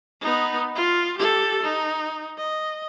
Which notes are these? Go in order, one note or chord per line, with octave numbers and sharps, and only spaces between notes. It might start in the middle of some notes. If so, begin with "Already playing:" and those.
B3 D#4
F4
G4 A4
D#4
D#5